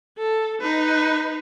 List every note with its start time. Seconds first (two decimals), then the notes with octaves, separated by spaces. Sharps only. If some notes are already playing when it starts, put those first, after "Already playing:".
0.18 A4
0.62 D#4 B4